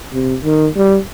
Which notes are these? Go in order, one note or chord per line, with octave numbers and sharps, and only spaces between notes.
C3
D#3
G3